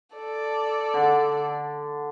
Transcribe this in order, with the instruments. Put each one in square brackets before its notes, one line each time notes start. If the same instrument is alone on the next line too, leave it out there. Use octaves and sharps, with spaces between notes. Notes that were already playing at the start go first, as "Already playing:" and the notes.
[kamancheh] A4 D5
[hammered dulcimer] D3